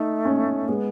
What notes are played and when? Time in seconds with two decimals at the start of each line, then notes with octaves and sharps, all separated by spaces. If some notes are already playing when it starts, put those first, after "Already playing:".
Already playing: A3 D#4
0.25 C#4
0.69 G#3 B3